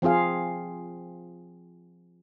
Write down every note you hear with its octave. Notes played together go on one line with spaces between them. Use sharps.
F3 C4 F4 G#4 F5